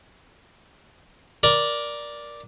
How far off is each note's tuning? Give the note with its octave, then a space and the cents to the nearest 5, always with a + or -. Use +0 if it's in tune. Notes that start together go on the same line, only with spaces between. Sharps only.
A#4 +15 D5 +0